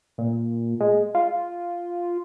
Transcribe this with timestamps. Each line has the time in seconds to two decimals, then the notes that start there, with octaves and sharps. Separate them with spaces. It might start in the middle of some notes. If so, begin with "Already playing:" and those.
0.18 A#2
0.80 G#3
1.15 F4